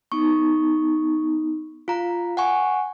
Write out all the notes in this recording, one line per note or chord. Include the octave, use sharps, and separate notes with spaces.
B3 D#4 C#6
F4 F5 A#5
F#5 G#5 C#6